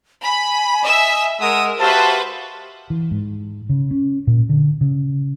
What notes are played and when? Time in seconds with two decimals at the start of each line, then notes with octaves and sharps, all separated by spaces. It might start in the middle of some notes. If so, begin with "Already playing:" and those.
0.24 G#5 B5
0.84 D#5 E5 E6
1.40 G#3 A#4 F#5 D#6 E6
1.80 F#4 G4 B4 C5 E5 F5 A5
2.90 E3
3.11 G#2
3.69 C#3
3.91 C#4
4.27 A#2
4.49 D3
4.81 C#3